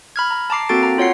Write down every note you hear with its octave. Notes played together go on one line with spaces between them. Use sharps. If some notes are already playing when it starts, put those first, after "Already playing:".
B5 F6 G#6
A#5
A5 A#5 D6 C7
A#3 C4 F#4 A4 A6 D7
A#5
F4 C#5 F#5 C7